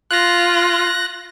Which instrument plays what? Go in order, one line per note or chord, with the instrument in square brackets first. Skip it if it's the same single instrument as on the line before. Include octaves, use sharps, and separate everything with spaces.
[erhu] F4 [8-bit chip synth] F#6 A#6